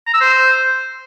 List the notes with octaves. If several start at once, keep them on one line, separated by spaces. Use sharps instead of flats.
A#5
E6
C5